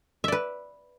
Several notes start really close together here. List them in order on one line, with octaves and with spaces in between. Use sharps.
E5 D5 B4